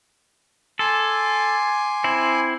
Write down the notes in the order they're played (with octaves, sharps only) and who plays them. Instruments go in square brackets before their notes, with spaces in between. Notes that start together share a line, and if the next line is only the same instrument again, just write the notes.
[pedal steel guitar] A4 [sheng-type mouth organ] G#5 C6 D6
[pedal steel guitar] C4 E4